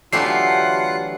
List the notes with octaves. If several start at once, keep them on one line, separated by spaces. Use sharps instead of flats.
D3 E3 F#3 A3 F4 G4 F#5 C7